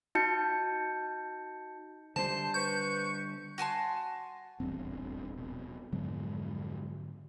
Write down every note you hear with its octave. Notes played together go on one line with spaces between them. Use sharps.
D#4 F#4 A5 G6 C#7
D3 G3 C5 A5
B4 C#6 G6
F#4 G#5 A5 C6
D#1 A1 E2 G2 C4
A#1 B2
F2 G#2 B2 D3 F#3 G#3